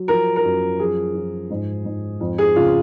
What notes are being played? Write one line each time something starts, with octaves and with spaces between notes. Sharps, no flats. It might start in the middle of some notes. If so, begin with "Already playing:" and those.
Already playing: F#3
F3 A#4
A#4
F#2
F3 G#4
F3
G#2
G#2
F2
G#4
C#3 F4